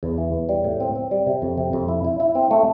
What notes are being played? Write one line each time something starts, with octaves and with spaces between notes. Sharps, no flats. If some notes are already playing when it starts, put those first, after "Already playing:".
E2
E3
E2
G3
A2
C4
C4
G3
C3
F2
C3
F2
E4
E4
E4
C4
A3